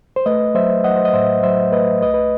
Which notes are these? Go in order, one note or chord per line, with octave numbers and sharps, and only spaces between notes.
C5
A3 B4 D#5
F#3 C5 E5
F#3 D#5 F#5
C5
D#5
A2 C5 E5
F#3 C5 E5
A3 B4 D#5
C2 B4 D#5
B4